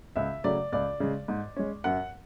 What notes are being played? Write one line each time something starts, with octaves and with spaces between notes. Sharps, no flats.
C#2 E5
C#3 F#3 A3 D5
C#2 D5
C#3 G#3
G#2
G#3 C#4
F#2 F#5